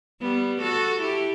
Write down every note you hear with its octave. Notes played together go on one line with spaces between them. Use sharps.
G3 B3
F#4 A4
E4 G4